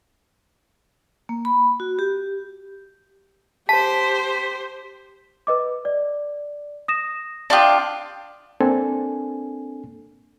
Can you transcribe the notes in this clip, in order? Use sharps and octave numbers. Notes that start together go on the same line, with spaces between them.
A#3
B5
F#4
G4
G4 C5 A5 B6
B4 D#5 D6
D5
D#6 A#6 E7
D4 F4 G4 A5 D#6
A#3 C4 D4 A4 G#5